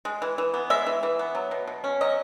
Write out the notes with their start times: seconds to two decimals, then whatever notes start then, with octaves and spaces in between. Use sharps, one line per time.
0.05 G#3
0.22 E3
0.38 E3
0.54 B3
0.70 G#3 E5
0.86 E3
1.03 E3
1.19 B3
1.35 F#3
1.51 B2
1.67 B2
1.84 C#4
2.01 F#3 D#5